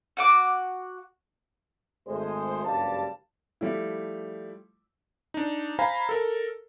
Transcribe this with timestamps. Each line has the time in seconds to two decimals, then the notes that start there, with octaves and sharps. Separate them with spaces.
0.17 F#4 F#5 D6
2.07 G#1 G#3 A3 C5
2.65 F#1 G2 G3 G#3 F5 A5
3.61 F3 G3 A3 E4
5.34 D4 D#4
5.79 C5 F5 G#5 A#5 B5
6.09 A4 A#4